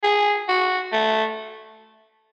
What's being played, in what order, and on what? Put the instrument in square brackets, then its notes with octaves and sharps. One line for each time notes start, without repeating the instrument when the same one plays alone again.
[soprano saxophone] G#4
F#4
A3